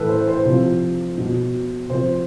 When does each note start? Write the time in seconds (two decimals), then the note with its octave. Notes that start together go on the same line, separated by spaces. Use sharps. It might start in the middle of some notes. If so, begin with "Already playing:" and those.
Already playing: A2 E3 A4 B4
0.09 C5
0.28 C5
0.45 C3 F3
1.18 B2
1.90 C3 F3 C5